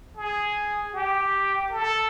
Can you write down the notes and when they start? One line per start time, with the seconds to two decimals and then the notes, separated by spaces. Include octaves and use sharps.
0.16 G#4
0.94 G4
1.71 A4